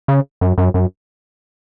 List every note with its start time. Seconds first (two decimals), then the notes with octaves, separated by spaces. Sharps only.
0.08 C#3
0.41 F#2
0.58 F#2
0.74 F#2